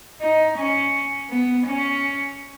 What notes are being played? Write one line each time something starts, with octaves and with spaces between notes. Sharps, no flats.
D#4
C#4
B3
C#4